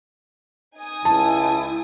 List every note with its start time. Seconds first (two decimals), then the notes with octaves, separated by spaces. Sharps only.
0.75 D#4 G#5 D#6
1.05 C#2 E4 A5